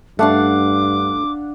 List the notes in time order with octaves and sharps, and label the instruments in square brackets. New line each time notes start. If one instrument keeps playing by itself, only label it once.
[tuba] G2 [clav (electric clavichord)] A3 [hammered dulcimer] D4 F5 F#5 [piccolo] D6